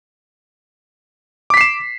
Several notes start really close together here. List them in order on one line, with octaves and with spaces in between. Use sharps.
D6 B6 C7 E7